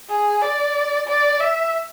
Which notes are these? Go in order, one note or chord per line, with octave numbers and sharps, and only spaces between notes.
G#4
D5
D5
E5